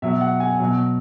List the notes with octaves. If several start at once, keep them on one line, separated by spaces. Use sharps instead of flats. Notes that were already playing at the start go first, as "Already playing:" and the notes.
B2 F#3 E5
F#5
G#5
B2 F#3